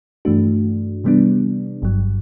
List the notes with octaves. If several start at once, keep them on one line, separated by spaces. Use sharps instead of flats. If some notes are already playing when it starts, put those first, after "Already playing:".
G2 E3 A3 D4 F#4
C3 E3 G3 B3 D4
G1 G2 F#3